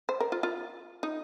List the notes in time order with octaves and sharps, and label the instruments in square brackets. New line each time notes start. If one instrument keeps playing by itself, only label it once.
[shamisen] C5
A#4
F4
F4
D#4